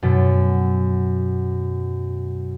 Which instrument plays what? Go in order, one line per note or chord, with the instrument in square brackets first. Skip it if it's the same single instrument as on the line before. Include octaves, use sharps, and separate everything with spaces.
[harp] F#2 B2